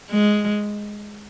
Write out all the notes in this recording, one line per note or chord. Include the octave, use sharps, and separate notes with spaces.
G#3